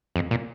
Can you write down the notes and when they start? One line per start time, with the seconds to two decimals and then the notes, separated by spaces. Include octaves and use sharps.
0.16 F2
0.31 A#2